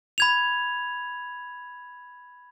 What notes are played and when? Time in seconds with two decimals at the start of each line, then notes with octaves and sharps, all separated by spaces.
0.18 B5 G#6 F7